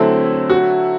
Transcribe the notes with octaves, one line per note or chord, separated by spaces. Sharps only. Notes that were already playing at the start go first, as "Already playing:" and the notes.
Already playing: D3 F#3 A3 C4 E4
F#4